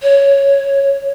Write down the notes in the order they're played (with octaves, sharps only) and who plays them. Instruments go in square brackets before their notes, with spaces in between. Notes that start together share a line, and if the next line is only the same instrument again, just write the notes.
[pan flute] C#5